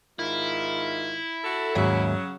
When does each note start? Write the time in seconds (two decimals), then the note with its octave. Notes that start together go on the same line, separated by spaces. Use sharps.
0.19 G#2 D#3 E4 F4
1.43 F#4 A4
1.75 D#2 G#2 C#3 F#3 E5